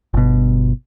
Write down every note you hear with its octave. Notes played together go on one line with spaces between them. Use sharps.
G1 B2